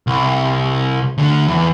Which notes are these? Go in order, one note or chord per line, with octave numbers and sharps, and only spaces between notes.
C2
D2 D3
E2